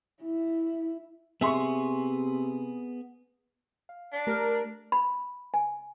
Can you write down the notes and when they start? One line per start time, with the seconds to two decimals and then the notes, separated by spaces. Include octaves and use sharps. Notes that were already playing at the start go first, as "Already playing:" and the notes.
0.23 E4
1.41 C3 B3 G#4 E5 C6 C#6
3.89 F5
4.13 D4
4.27 A3 G4 A#4
4.92 B5
5.54 G#5